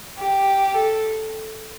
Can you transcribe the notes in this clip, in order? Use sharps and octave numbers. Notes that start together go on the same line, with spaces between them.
G4
A4